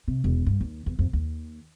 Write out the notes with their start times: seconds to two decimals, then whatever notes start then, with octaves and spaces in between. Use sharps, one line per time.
0.08 C3
0.24 E1
0.46 G2
0.61 D#2
0.86 E2
0.99 F2
1.13 D#2